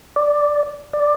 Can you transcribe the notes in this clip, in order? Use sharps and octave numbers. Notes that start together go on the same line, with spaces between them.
D5
D5